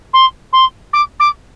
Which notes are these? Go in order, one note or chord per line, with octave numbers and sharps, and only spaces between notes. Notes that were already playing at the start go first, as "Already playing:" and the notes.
C6
C6
D6
D6